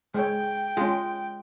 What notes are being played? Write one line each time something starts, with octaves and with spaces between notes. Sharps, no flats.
G#3 C#5 G5
G#3 C#4 F4